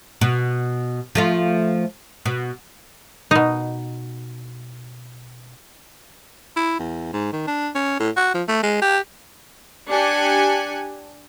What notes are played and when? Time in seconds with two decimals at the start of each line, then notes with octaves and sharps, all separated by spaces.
0.21 B2
1.15 F3 A3 F4
2.26 B2
3.31 B2 D#4
6.57 E4
6.79 E2
7.13 G#2
7.33 D#3
7.48 D4
7.75 C#4
8.00 A2
8.17 F#4
8.35 F3
8.48 A3
8.63 G#3
8.82 G4
9.90 D4 G4 G#5 F#6 C#7